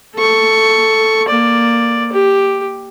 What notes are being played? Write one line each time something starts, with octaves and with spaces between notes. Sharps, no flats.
A4 C#6
A#3 D5
G4